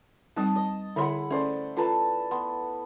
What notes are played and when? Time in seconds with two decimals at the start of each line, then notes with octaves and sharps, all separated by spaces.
0.36 G3 C4 D#4 A5 D#6
0.56 D#5
0.96 D3 E4 G#4 C#5 F#5 C6
1.31 A3 C#4 C5 D5
1.77 F4 A4 B4 A5 A#5
2.31 B3 C6